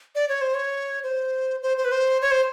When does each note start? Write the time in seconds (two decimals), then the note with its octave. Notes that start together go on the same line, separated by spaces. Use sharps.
0.15 D5
0.29 C#5
0.41 C5
0.54 C#5
1.03 C5
1.63 C5
1.78 C5
1.85 B4
1.92 C5
2.22 C#5
2.31 C5